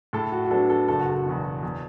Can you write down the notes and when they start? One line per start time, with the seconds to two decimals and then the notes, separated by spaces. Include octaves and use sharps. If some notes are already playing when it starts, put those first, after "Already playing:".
0.13 A2 A4
0.32 F#4
0.44 F#4
0.51 F#3 B3 D4 A4
0.70 A4
0.88 F#1 A4
0.99 F#4
1.10 A4
1.26 E2 B2
1.63 E2